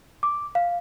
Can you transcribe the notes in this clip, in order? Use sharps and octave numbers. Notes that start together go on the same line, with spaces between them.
D6
F5